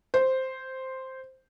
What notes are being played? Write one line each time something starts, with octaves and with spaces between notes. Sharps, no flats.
C5